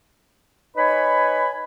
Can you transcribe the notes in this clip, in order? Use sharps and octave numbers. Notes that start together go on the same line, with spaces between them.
D#4 B4 C#5 G#5 B5